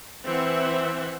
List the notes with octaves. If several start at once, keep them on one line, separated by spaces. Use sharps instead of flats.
E3 C4 E5 F#5